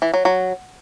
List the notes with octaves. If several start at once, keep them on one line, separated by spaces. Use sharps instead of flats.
E3
F#3
F#3